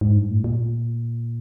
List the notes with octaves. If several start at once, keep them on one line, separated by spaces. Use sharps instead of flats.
G#2
G2
A2
A#2